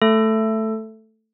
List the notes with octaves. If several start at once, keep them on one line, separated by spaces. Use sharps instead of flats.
A3 A4